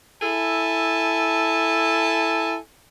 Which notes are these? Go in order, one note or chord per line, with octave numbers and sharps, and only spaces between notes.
E4 A4 G#5 A5